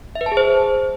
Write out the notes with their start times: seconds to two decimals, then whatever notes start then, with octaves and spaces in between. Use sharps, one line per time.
0.15 E5
0.21 B4
0.26 A5
0.32 G#4
0.37 C5